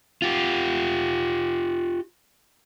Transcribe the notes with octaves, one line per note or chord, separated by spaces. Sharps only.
F4 G4